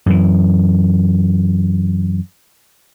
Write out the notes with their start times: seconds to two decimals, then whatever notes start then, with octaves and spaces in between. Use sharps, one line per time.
0.06 F#2 E3